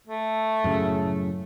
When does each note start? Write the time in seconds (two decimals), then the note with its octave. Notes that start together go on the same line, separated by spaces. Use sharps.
0.07 A3
0.64 F#2 A2 C#3